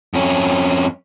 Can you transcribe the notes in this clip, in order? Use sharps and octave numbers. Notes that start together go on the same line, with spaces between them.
F2 C#4